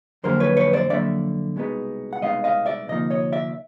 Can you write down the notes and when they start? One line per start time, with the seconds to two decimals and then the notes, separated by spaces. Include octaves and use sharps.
0.24 F2 D3 F#3 A#3 A#4 C5
0.40 B4 C#5
0.57 B4 C#5
0.73 C5 D5
0.90 F2 D3 F#3 A#3 D5 E5
1.56 C2 B2 G#3 B3 D#4
2.13 F#5
2.22 C2 B2 G#3 B3 D#4 D#5 F5
2.44 D#5 F5
2.66 D5 E5
2.88 D2 C3 F3 A#3 D#4 D#5
3.10 C#5 D#5
3.32 D5 E5